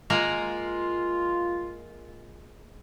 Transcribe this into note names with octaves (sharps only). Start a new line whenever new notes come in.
G#3 A#3 F4 A#4